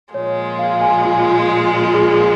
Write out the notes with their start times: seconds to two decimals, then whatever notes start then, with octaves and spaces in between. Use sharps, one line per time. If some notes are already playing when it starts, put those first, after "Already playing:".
0.14 A#2 F3 G#3 C#5
0.59 F5
0.81 G#5
1.05 F4
1.82 F4
1.94 G#4